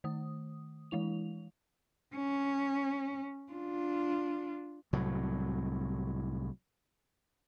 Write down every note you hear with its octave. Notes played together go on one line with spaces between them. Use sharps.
D#3 A3 D#6
E3 G#3 E4 F7
C#4
D4 F4
C2 A2 F#3